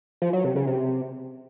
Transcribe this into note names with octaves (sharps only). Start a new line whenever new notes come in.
F3
F#3
C3
C#3
C3